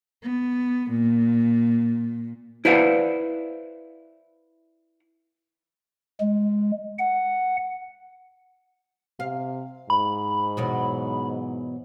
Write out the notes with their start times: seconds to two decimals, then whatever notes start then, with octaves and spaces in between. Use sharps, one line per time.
0.23 B3
0.90 A#2
2.65 E4 B4 C5 D5 F5 F#5
6.21 G#3
6.99 F#5
9.20 C3 F5
9.90 G#2 B5
10.57 E2 B2 F#3